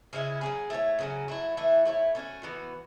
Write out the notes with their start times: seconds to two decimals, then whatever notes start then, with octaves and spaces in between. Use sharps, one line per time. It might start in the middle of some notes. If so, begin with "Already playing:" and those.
0.13 C#3 G#3 C#4 E4
0.41 F#3 C#4 G#4
0.70 A3 E4 G#4 C#5
0.99 C#3 F#3 C#4
1.28 F#3 A3 E4
1.57 E3 A3 E4
1.85 A3 E4 A4 C#5
2.15 A3 C#4 F#4
2.43 E3 B3 F#4 B4